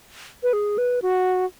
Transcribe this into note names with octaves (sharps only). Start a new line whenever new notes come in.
B4
G#4
B4
F#4